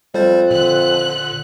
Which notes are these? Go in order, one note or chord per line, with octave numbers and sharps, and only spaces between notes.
F2 G3 C5 A6
A#2 D3 F#6